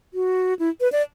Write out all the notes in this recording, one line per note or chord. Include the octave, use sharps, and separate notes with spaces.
F#4
E4
B4
D5